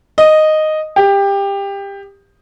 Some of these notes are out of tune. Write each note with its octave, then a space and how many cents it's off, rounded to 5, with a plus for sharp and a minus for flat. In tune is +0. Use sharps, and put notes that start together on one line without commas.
D#5 -5
G4 +20